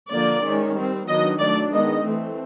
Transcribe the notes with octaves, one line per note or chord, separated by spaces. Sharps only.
D3 F3 A#3 D5
D#3 G#3 C#4
G3 C4
D#3 F#3 B3 D4 D#5
F#3 A3 D4 D5
D#3 G#3 B3 D#5
E3 A3 C4